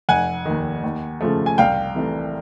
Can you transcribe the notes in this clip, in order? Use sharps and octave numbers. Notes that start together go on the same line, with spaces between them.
F1 F#5 G#5
D#2 D#3
D#2
C#3 F3 A3
G#5
C2 F5 G5
C3 E3 A3